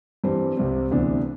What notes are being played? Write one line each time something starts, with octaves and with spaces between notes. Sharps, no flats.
G2 E3 G3 C4
C2 C3 G3 C4
D2 C3 E3 B3 D4